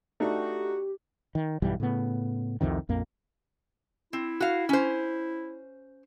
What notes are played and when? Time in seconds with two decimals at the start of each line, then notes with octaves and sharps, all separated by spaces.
0.20 A3 D4 D#4 F#4 G4
1.35 D#3
1.62 B1 G2 E3 G3
1.80 A2 C#3 B3
2.61 C2 F2 C3 D#3
2.89 A#1 F2 A#3
4.13 C4 E4
4.41 F#4 F5
4.69 C#4 C5